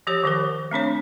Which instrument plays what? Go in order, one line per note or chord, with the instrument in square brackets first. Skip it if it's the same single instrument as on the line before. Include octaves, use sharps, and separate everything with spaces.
[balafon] F3 G4 C#5
D#3 F3 A#4
A3 C4 D4 C#5